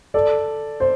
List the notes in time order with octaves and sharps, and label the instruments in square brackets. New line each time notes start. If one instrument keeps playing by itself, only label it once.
[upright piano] A4 D5
C5